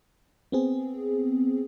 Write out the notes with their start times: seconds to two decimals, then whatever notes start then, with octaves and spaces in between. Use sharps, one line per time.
0.52 B3 C4 G#4